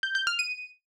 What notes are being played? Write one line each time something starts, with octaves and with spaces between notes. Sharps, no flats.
G6
G6
F6
D#7